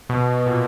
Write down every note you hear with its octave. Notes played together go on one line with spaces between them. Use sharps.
B2
A#2